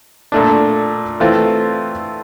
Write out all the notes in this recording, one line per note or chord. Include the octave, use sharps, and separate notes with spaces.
A#2 A3 D4
E3 A3 C4 F4